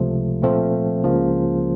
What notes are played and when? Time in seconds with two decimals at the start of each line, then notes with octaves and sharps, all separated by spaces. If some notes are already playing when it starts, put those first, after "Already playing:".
Already playing: C#2 C3 F3 A3
0.42 A#2 F3 A3 C4 F4
1.04 C#2 C#3 F3 A#3